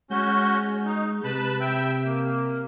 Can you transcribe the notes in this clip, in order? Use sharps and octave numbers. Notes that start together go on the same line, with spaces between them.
G#3 C#4 F#4 G6
D#4
C3 B4 A5 B5
E5 G5 E6
A#3